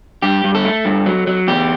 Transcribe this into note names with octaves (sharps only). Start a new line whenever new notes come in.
G2 G4
G2
A4
A3
G2
F#3
F#3
E2 G4